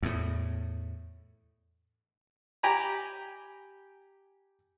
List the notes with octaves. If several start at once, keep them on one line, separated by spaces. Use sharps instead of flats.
E2 A2
G4 G5 G#5 A#5 B5